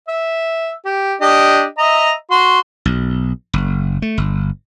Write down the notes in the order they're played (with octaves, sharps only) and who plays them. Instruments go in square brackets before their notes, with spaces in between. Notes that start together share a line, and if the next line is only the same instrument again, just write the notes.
[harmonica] E5
G4
D4 G4 D#5
D#5 E5 A#5
F#4 C6
[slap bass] B1
F#1
A3
G1